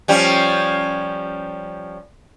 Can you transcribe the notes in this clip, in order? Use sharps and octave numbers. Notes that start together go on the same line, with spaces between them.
F3 G3 C#4